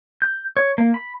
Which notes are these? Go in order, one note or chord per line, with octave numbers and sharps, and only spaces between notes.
G6
C#5
A#3
B5